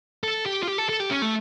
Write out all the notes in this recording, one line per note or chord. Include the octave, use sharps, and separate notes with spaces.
A4
G4
F4
G4
A4
A4
G4
C#4
A3